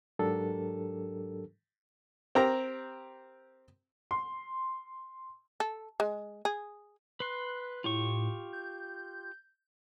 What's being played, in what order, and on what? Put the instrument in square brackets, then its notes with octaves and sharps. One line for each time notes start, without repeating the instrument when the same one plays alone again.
[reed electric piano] G#2 F#3 D4 G4 A4 A#4
[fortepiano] C4 G4 A#4 A#5
[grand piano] C6
[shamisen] A4
G#3
G#4
[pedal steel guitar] B4 C6 [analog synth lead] F#6
[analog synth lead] A2 [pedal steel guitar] F4 G4 C#6
[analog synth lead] G6